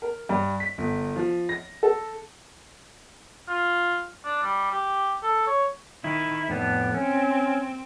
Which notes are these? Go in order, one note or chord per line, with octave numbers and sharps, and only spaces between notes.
A#4
G2
B6
G1
F3
A#6
A4
F4
D4
G3
G4
A4
C#5
D#3 E4
F2 A2 B3 D4
C4 C#4